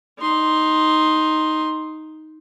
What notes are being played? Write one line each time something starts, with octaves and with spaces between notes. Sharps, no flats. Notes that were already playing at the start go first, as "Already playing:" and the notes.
D#4 C6